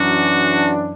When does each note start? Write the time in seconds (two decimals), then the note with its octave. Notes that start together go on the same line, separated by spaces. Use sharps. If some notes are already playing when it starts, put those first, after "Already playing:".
Already playing: F#2 E3 D4 F#4